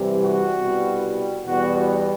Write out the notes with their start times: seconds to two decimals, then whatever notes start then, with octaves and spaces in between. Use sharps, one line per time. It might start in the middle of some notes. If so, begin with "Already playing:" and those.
Already playing: C2 C3 E3 G3
0.19 F#4
0.62 C2 B2 G3
1.45 E2 B2 G3 F#4